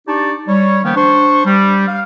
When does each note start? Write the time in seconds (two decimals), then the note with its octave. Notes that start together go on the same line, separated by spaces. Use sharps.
0.08 D4 D#4 G4 D5 A5 C#6
0.48 G3 C#5
0.84 D#3 F3 A#3 B3 C#4 G5
0.96 D4 C5 C#6
1.45 G3
1.87 F5